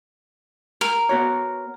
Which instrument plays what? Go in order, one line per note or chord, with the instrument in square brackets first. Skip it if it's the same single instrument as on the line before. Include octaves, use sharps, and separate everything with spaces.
[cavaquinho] A#4
[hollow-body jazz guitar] B3 F#4 C#5